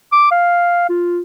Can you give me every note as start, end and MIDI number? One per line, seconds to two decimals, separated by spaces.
0.12 0.28 86
0.31 0.89 77
0.89 1.21 65